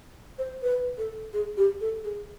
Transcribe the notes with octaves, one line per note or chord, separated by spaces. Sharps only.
C5
B4
A4
G#4
G4
A4
G#4